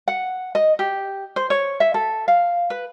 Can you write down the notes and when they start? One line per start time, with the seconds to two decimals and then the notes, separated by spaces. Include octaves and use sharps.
0.08 F#5
0.55 D#5
0.79 G4
1.36 C5
1.50 C#5
1.80 E5
1.94 A4
2.28 F5
2.70 B4